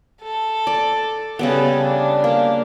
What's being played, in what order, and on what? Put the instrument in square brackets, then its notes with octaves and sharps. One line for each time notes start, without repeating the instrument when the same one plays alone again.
[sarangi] A4
[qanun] D5
[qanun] C#3 G3 B3 [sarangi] A4
[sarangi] D4
[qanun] A#3